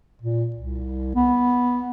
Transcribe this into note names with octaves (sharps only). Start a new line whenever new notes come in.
A#2
C2
B3